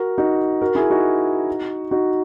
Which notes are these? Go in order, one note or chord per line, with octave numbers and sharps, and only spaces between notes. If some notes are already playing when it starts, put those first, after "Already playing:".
Already playing: F#4 A#4
D#4 F#4
F#4 A#4
E4 G#4
D#4 F#4
D#4 F#4